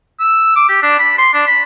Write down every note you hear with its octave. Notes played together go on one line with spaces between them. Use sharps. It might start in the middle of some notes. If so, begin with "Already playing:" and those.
E6
D6
G4
D4
B5
C6
D4
B5